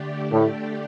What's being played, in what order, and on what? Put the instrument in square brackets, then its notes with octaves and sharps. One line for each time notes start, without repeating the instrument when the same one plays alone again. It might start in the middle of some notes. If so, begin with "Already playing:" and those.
Already playing: [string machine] D3 A3 D4 G4
[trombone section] A2